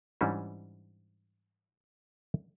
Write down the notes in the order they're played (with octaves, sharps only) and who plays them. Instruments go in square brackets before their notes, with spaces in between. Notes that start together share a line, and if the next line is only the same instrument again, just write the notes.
[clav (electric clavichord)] G#2 E3 G3 C#4 D4